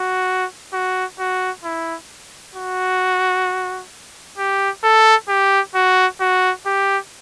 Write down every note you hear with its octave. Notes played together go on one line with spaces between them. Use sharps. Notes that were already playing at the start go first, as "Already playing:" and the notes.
Already playing: F#4
F#4
F#4
E4
F#4
G4
A4
G4
F#4
F#4
G4